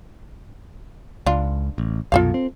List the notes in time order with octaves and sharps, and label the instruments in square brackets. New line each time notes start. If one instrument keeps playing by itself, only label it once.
[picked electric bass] C#2 [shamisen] D4 F4
[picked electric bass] A1
[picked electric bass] C2 F#2 B2 [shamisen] F4 A4 F5
[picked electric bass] C4